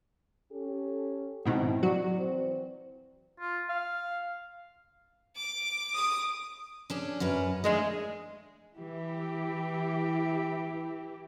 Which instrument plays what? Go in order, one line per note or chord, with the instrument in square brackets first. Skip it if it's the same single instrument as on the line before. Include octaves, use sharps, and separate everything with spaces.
[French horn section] C#4 G4 A4
[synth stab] G#2 B2 D#3 [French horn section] C4 E4
[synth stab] F#3 F#4 [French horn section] D5
[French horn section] E3 C4 C5
[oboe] F4
F5
[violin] D6
[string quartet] D#6
[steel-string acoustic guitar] C#4 D4 G#4
F#2 C#4 B4
[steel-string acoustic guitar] D#3 A3 D4 [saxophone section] G#3
[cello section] E3 E4 G4